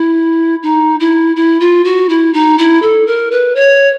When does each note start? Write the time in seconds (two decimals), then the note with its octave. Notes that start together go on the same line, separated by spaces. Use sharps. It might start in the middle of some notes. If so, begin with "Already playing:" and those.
Already playing: E4
0.62 D#4
1.00 E4
1.36 E4
1.60 F4
1.84 F#4
2.09 E4
2.33 D#4
2.58 E4
2.82 A4
3.07 A#4
3.31 B4
3.55 C#5